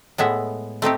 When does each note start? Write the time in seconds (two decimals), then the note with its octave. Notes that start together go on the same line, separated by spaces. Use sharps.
0.18 A2 G#3 B3 E5
0.82 A3 C4 D#4 G4